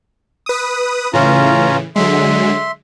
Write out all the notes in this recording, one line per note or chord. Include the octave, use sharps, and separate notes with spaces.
B4 D#6
A2 C#3 E3 C#4 F4 A#5
D3 F#3 G#3 E5 C6